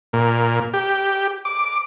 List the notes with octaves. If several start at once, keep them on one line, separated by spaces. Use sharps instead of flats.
A#2
G4
D6